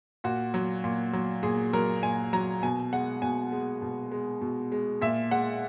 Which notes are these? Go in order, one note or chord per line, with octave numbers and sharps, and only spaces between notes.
A#2 F#4
F#3
A#2
F#3
A#2 G#4
F#3 A#4
A#2 G#5
F#3 A#5
B2 G#5
G#3 F#5
B2 G#5
G#3
B2
G#3
B2
G#3
A#2 E5
G#3 F#5